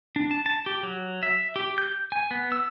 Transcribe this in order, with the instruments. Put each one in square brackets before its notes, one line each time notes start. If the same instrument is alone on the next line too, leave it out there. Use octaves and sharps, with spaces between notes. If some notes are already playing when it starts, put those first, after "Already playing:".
[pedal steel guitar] D4
A5
A5
G4
F#3
E5
G4
G6
G#5
B3
E6